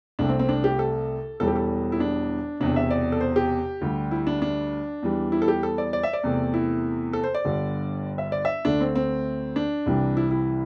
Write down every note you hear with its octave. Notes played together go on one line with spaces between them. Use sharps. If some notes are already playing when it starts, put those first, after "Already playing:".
C2 C3 A3 D4
C4
C4
D4
G4
A4
E1 E2 E3 G3 A4
G4
A4
E4
D4
E1 E2 C3 D4
E5
D5
A4
C5
G4
D2 D3 G3
E4
D4
D4
E2 E3 G3
E4
A4
G4
A4
D5
D5
E5
D5
E2 C3 A3
E4
A4
C5
D5
G1 G2 D3 G3
E5
D5
E5
D2 D3 A3 D4
C4
C4
D4
C2 C3 E3 G3
E4
E4